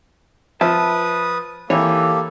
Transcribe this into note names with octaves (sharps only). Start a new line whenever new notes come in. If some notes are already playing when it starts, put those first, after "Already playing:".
F3 B4 E5 A5 D#6
E3 A#3 G4 A4 C#5